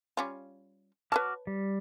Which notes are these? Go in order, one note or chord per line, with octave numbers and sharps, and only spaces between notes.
G3 C#4 F4
F#4 B4 C#5 A5 D6 F6
G3